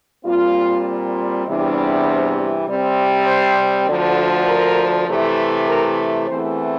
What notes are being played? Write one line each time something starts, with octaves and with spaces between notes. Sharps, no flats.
A#2 G3 C4 F4
E2 C3 E3 G3 D4
C5
C3 G3 C4
C5
D2 D3 F3
A#4
C3 E3 A3
A#4
E2 E3 A3 C4 C5